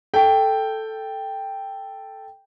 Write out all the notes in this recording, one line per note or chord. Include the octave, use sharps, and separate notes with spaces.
A4 G5